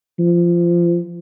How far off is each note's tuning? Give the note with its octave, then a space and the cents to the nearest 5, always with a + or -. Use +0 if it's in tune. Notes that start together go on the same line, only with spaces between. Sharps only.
F3 -20